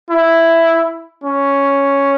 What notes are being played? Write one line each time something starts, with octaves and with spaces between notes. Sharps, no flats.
E4
C#4